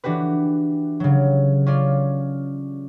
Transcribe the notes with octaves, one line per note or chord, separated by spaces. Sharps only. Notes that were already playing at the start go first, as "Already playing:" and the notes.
E3 D4 F#4 G4 B4
C#3 F#3
C#4 F4 D5